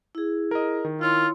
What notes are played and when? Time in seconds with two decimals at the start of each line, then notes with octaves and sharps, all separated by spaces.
0.15 E4 G#4
0.51 A#4 D#5
0.85 D#3
1.01 E4 F4 C#5 C6